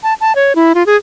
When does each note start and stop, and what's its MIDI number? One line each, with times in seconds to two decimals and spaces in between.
0.03 0.14 81
0.21 0.33 81
0.35 0.55 73
0.55 0.73 64
0.75 0.86 65
0.86 0.96 68